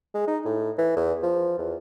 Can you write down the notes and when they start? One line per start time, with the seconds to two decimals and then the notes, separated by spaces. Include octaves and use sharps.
0.14 G#3
0.27 D#4
0.45 A2
0.78 E3
0.96 E2
1.23 F3
1.58 E2